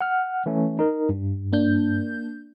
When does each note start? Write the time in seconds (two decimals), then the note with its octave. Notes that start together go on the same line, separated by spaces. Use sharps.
0.01 F#5 F6
0.46 E3 A3 C#4
0.79 D#4 A#4
1.09 G2
1.53 A#3 D4 G6